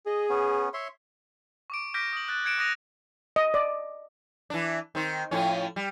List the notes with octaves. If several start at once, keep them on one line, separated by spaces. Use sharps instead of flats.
G#4 D#5
B3 C#4
C#5 E5 C6
C#6 D6 D7
D6 F6 G6 A#6 B6 D7
D#6 F#7
F#6 A6
F#6 G#6 C#7 D7 E7
D6 D#6 F#6 A#6 D#7 F7
D#5
D5
E3 D4
D#3 C4
A2 F3 C#4
G3